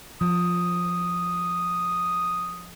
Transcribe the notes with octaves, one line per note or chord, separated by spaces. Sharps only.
F3 D#6